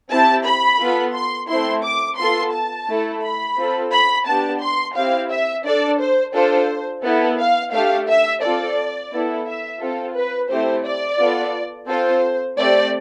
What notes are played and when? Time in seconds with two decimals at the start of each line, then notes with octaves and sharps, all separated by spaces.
0.10 C4 E4 G4 A5
0.46 B5
0.80 B3 F4 A4
1.14 C6
1.49 A3 C4 E4 C6
1.84 D6
2.18 B3 F4 A4 C6
2.53 A5
2.88 A3 E4 A4
3.22 B5
3.57 C4 F4 A4
3.92 B5
4.26 B3 D4 G4 A5
4.61 C6
4.95 C4 E4 G4 F5
5.30 E5
5.65 D4 A4 D5
5.99 C5
6.34 D4 F4 A4 C5
7.04 B3 E4 A4
7.39 F5
7.73 A3 D4 G4 F5
8.08 E5
8.42 C4 F4 A4 D5
9.11 B3 E4 A4
9.47 E5
9.80 C4 F4 A4
10.16 B4
10.49 A3 C4 E4 G4 C5
10.85 D5
11.19 B3 F4 A4
11.88 C4 F4 A4 C5
12.57 A3 C4 G4 D5